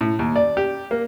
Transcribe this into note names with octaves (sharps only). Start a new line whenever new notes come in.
A2
D#2
D5
G4
A#3